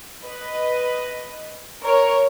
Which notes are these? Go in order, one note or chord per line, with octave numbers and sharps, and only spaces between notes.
B4 D#5
A#4 C#5